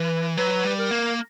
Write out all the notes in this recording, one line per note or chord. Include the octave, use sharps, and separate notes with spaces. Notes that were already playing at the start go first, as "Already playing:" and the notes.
Already playing: E3 B4
F#3 B4
G3
A#4
A#3